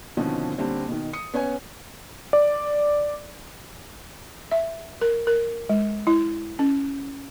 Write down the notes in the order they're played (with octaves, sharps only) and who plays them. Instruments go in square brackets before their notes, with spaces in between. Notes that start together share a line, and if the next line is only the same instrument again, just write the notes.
[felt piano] B2 D3 D#3 F3 C4 C#4
A#2 D3 G3 C4 C#4
B2 D#3
D#6 C#7
B3 C#4 C#5 G#5
[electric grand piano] D5
[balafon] E5
A#4
A#4
G#3
E4
C#4